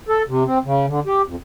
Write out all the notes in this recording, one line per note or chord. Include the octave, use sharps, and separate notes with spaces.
A4
C3
C4
C#3
D3
G4
F2